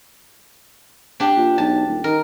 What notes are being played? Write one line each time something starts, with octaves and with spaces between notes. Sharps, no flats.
D4 G4
A#2
B1 A5
D#1
D#3 A#4